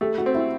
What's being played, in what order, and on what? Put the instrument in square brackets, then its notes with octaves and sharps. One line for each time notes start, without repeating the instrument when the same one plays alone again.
[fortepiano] A3 [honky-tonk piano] G4
[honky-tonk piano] F#4
[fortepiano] C4
[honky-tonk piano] E4